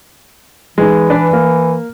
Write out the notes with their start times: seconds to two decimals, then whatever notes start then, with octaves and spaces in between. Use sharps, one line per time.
0.78 E3 G#3 D#4
1.10 D4 B4 D5
1.33 A#3